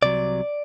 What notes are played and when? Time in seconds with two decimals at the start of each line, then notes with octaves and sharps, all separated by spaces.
0.03 C2 C3 F#3 D5